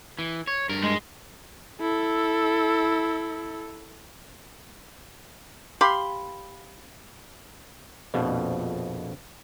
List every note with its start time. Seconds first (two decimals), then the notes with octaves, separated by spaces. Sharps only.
0.19 E3
0.47 C#5
0.69 G2 A#4
0.83 G#3
1.81 E4 A4
5.81 G4 F5 B5 C6
8.14 A#1 F2 B2